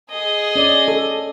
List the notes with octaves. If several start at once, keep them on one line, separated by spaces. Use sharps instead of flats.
G#4 D#5
C#4 D5
A4